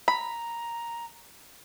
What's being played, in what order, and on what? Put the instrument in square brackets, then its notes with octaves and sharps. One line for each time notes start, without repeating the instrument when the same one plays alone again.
[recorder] A#5 [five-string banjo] B5